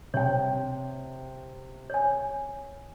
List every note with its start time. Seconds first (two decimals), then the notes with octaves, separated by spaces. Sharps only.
0.14 C3 C#5 G5
1.90 C#5 G#5